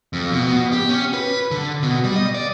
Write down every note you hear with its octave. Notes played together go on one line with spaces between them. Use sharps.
F2
B2
B2
G4
C#4
B4
D3
B2
G3
D#5
D5